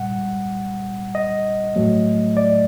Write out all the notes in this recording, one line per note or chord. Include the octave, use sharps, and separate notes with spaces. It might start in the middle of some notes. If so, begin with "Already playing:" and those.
Already playing: A#2 G3 F#5
D#5
A2 F#3 A3
D5